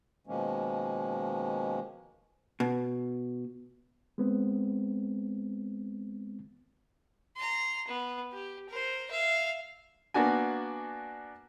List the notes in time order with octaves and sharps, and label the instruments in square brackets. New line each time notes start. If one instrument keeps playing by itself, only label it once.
[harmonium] B2 D#3 F3 G#3 A#3 C#4
[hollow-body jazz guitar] B2
[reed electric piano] G#3 B3 C4
[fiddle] A#5 C6
B3
G4
A#4 C5
E5 F5
[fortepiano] A#3 B3 D4 F#4 G#5